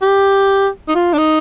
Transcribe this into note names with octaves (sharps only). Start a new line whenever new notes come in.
G4
D#4
F4
D4
D#4